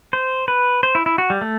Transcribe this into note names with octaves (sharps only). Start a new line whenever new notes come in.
C5
B4
C5
E4
E4
F#4
G3
A3